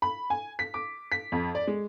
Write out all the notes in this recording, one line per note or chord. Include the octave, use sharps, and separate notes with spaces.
B5
G#5
B6
D6
B6
F2
D5
G#3